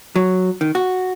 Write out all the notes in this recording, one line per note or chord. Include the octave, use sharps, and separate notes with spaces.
F#3
D#3
F#4